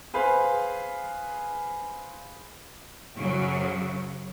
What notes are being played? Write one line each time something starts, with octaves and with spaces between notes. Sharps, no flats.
G#4 B4 C5 F5
F#2 C#3 F#3